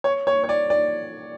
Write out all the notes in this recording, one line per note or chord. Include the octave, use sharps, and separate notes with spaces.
C#5
C#5
C#5
D5
D5